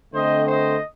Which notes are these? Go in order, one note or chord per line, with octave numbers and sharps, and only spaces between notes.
D3 A3 C4 C5 D#5
C5 D#5